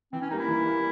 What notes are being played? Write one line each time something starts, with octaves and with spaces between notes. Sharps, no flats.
E3 C4
C#4
G3 A#3 D#4
E4
E3
G3 A#3